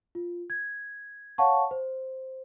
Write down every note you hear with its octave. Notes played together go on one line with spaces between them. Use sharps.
F4
G#6
C#5 F5 F#5 A5 C#6
C5